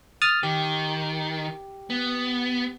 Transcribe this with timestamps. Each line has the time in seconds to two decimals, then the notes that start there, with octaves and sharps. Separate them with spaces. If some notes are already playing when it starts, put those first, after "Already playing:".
0.22 D#6 F6 A6
0.43 D#3 G4
1.90 B3